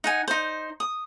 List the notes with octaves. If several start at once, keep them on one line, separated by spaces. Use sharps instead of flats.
D#4 F#5 G#5
D#4 C5
D#6